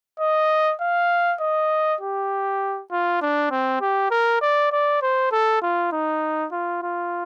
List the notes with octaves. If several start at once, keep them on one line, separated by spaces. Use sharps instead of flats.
D#5
F5
D#5
G4
F4
D4
C4
G4
A#4
D5
D5
C5
A4
F4
D#4
F4
F4